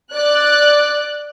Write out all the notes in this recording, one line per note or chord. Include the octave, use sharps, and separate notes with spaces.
D5 F#6